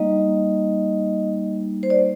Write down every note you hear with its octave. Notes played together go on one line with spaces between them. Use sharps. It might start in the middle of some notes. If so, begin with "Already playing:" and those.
Already playing: G3 A#3 D#4 D#5
C5
D5